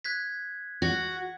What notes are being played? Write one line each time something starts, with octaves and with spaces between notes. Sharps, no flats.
F#6 G#6 B6
F#4